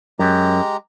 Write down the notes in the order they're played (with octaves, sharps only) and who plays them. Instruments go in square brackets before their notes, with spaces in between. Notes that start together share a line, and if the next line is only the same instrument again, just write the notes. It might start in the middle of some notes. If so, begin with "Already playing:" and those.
[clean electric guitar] F#2 [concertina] G#3 G4 A#5